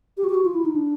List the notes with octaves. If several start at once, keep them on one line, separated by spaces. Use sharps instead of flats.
G4
F#4
G4
F#4
F4
E4
D#4
D4